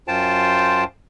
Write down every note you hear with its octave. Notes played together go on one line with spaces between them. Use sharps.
F#2 F4 C5 G5 A5